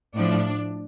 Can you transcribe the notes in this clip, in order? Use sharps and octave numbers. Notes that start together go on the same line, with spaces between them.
A2 F3 D4